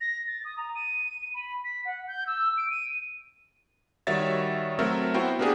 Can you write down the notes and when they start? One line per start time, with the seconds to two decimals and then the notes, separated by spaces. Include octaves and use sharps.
0.01 A#6
0.27 A6
0.45 D#6
0.57 A#5
0.75 D#7
1.34 B5
1.64 B6
1.85 F#5
2.08 G6
2.27 E6
2.58 D7
2.70 D#7
4.07 D#3 G3 F#4 C#5 E5 A6
4.79 F#3 A3 C4 A4 A#4 E5
5.14 B3 E4 F#4 C5 G5
5.39 A#3 B3 D4 G4 G#4